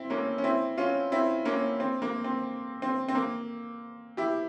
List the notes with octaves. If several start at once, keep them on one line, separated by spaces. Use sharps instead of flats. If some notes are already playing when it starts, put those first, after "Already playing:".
Already playing: C4 E4
A#3 C#4
C#4
C4 E4
C#4 F4
C4 E4
A#3 C#4
C4
A#3
C4
C4
C4
A#3
E4 G4